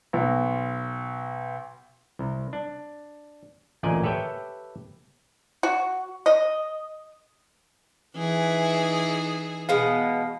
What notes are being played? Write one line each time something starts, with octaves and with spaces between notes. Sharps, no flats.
B1
C2
D4
A1 D2 A#2 D5 D#5 G#5
G4 A4 B4 C#5 E5 G5
F#4
D#5
E3 D#4 G#4
B2 G#3 B3 F5